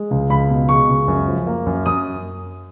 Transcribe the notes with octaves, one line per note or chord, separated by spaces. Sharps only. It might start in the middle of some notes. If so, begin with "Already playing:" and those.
Already playing: G#3
C#2
C#2 B5
B2
G#3 C#6
C#2
F#2
F3
A#3
F#2
F#2 D#6